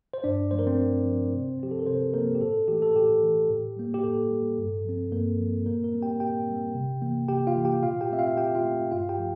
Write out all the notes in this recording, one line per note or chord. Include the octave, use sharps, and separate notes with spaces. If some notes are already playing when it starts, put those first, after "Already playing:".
C5
G2 D4 D5
F3 A3 C5
A#4
C4 C5
G2
F3 A3
C3
F3 C4 G4
A4
A#4
C3 C4 C5
F3 A#3 C4 A#4
G4
A2 A4
E3 A3 G4
A4
A2 G4
E3 A3
A2
G3 A#3
G4
A2 A4
G3 A#3
G2
F3 C4
G2 A#3 A#4
F3 C4
A#2 A#3 A#4
A#3 A#4
G3 C4
G4 G5
A#2 G4 G5
G3 C4
C3
E3 A#3
C3 G4 G5
F4 F5
E3 A#3
G4 G5
A#2 F4 F5
G4 G5
A3 C4 E5
F4 F5
A#2 G4 G5
F4 F5
A3 C4
G2 F4 F5
G4 G5
F3 A3